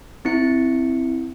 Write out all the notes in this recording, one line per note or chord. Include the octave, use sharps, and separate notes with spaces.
C4 E4 C#7